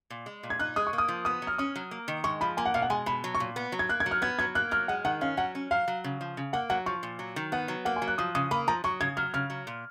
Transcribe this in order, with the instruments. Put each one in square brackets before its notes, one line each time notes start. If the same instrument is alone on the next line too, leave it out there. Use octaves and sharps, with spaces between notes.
[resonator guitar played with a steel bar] A#2
G#3
A#2
[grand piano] G#6
[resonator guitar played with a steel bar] D#4 [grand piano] F#6
[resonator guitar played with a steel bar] G#3 [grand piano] D#6
[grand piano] C#6
[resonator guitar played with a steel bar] A#3
[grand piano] D#6
[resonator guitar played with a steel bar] F3
[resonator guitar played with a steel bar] B3 [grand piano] D#6
[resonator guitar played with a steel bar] F#3
[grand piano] F6
[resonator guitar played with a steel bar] C#4 [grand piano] D#6
[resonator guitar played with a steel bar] F#3
A#3
D#3
[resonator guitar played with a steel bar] G#3 [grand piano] C#6
[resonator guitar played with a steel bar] F3 [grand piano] B5
[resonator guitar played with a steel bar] A#3 [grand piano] G#5
[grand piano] F#5
[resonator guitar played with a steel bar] B2 [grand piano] F5
[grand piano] F#5
[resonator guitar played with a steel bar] G#3 [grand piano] G#5
[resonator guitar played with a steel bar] B2 [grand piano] B5
[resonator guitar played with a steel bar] F#3
[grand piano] C#6
[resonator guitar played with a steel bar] A#2
B3
F#3
[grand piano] G#6
[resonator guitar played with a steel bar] A#3 [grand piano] F#6
[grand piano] G#6
[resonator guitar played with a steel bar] F#3
[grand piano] F6
[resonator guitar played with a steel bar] B3 [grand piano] G#6
[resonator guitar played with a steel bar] F#3 [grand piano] G#6
[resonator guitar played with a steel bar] A#3 [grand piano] F#6
[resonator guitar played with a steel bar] F#3 [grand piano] F6
[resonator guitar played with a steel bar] G#3 [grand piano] F#5
[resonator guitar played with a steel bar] D#3 [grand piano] F#5
[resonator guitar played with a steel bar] C#4 [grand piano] F5
[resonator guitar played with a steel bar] F#3 [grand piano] F#5
[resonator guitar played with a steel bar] C#4
[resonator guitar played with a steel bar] F#3 [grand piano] F5
[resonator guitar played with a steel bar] F#3
C#3
F3
C#3
[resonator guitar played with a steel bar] A#3 [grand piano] F#5
[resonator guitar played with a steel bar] F#3 [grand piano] F#5
[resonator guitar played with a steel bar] F3 [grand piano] C#6
[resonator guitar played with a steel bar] A#2
F#3
D#3
[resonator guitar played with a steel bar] B3 [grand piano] F#5
[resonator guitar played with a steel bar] F#3
[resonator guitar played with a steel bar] A#3 [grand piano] F#5
[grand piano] G#5
[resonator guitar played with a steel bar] F#3
[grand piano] F#6
[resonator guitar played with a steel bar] F3 [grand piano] D#6
[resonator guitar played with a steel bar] C#3 [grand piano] D#6
[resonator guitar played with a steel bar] A#3 [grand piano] B5
[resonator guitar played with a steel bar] F3 [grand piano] A#5
[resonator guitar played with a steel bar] F#3 [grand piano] C#6
[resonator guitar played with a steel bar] C#3 [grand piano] G#6
[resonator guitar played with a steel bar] F#3 [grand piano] F6
[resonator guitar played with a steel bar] C#3 [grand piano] F6
[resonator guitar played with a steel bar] F#3
A#2